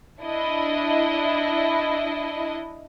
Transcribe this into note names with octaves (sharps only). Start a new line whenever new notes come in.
D4 E4 D#5